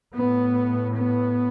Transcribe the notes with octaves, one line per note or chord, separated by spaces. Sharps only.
A2 B3
B3